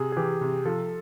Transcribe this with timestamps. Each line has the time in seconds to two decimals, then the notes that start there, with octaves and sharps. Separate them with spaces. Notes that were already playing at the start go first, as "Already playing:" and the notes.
Already playing: C3 G#4
0.12 G#4
0.17 E3 G4
0.41 C3
0.65 F3 A4